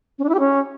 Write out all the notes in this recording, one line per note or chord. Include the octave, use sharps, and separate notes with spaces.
C#4
D4
E4
G4
C#4